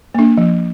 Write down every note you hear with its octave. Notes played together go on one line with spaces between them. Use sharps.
A#3 D4
F3